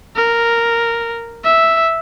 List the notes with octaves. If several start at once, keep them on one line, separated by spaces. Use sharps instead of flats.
A#4
E5